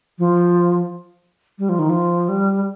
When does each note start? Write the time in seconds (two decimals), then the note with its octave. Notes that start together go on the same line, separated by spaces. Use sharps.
0.19 F3
1.59 G3
1.69 F3
1.79 D#3
1.89 F3
2.29 G3